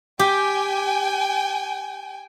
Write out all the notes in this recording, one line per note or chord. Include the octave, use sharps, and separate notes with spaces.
G4 G5 G#5